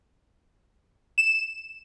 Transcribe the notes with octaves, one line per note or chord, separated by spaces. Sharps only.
E7